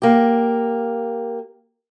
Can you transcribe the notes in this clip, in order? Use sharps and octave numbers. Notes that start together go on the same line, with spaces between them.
A#3 G4